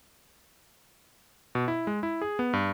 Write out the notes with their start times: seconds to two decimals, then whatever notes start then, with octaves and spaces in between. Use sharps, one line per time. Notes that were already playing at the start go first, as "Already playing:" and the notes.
1.55 B2
1.68 E4
1.87 G#3
2.03 E4
2.21 G#4
2.39 B3
2.53 G2